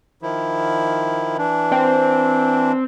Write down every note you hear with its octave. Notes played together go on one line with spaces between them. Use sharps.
D#3 F3 E4
E3 D4
C4